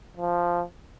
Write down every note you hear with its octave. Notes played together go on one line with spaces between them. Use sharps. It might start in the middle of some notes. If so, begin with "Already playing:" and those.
F3